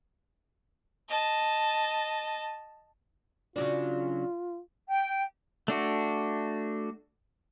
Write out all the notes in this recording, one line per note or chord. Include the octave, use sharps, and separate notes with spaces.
D#5 A5
C#3 F#3 D4 F4
G5
A3 D4 F#4